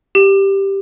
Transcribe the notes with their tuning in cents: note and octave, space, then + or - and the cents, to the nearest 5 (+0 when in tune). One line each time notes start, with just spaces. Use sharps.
G4 +0